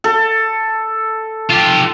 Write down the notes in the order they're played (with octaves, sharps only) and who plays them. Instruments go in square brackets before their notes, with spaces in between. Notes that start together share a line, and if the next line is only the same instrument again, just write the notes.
[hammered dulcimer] A4
[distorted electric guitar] F4 G4